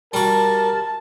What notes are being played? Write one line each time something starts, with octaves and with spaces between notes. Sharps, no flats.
G3 F#4 A#4 A5